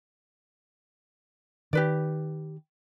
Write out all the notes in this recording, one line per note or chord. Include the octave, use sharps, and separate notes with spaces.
D#3 G4 B4 D5